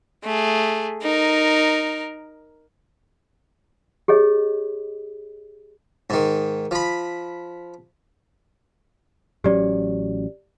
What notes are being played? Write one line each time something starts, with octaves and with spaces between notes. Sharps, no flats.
A3 G#4
D#4 A#4
G4 G#4 C#5 D#5
G#2 D#3
F3 B5
A1 F#3 C#4 G4 D5